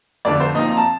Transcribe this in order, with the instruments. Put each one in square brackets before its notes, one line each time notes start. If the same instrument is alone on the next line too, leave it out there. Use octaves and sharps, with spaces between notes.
[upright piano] F2 D3 A3 D5
C5
A#2 F3 C4 D#4 D#5
A#5
A5